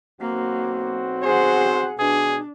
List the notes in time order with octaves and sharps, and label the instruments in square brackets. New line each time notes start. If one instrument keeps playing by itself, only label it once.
[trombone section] B1 C4 F#4 [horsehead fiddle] A#3
[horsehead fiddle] G#4 F#5 [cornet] C5
[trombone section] B2 [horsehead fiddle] D4 [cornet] G#4